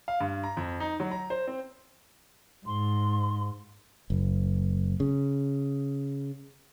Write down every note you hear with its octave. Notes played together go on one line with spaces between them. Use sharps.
F5
G2
A#5
F2
D#4
F#3
A#5
C5
C4
G#2 C6
F#1
C#3